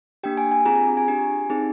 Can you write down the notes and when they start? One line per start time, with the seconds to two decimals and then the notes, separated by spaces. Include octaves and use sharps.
0.23 A#3 D4 G4 G5
0.37 G#5
0.51 G#5
0.65 C4 F4 G#4 A#5
0.76 A#5
0.97 G#5
1.08 D4 G4
1.50 C4 D#4 G#4